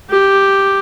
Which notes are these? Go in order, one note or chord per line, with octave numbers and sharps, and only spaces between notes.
G4